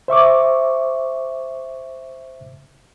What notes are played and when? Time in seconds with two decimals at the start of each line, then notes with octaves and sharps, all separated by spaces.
0.08 C5 E5 C#6 D6